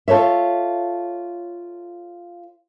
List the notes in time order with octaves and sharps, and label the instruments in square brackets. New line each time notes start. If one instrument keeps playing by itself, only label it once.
[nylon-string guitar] F4 A4 C5 C#5 E5